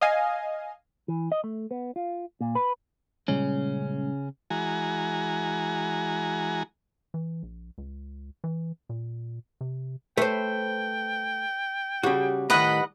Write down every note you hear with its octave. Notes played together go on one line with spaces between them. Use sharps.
D#5 F5 G#5
E3
D#5
A3
B3
F4
A#2
B4
A#2 C#3 G3 G#3 C#4
E3 G#3 F#4 G#5 A#5
E3
A#1
C#2
E3
A#2
C3
A3 B4 C5 G5
C#3 G3 F#4
A2 D#3 B4 D#5 F#5 B5